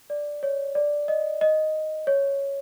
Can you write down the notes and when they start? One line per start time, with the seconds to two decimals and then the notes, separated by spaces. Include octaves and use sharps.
0.10 D5
0.43 C#5
0.75 D5
1.08 D#5
1.41 D#5
2.07 C#5